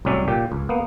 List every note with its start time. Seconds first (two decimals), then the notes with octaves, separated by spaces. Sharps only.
0.05 C2 A2 F#3 C#4 D5 E5
0.28 A#2 G4
0.52 C#2
0.69 A#3 B3